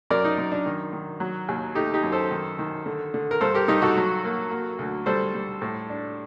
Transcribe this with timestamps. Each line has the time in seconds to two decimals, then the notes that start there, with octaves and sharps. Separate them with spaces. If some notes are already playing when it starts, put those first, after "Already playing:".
0.10 F#2 A#4 D5
0.24 D#4
0.38 F#2
0.52 D4
0.66 D#3
0.93 D#3
1.20 F#3
1.49 D#2
1.75 A3 D#4 G4
1.94 D#4 G4
2.03 F#2
2.12 A4 C5
2.31 D#3
2.59 D#3
2.86 D3
3.14 D3
3.31 A#4
3.41 G2 A4 C5
3.54 G4 A#4
3.68 G2 D#4 G4
3.82 F#4 A4
3.97 F#3
4.24 A#3
4.51 A#3
4.79 D2
5.06 G3 A4 C5
5.34 G3
5.62 A2
5.90 D4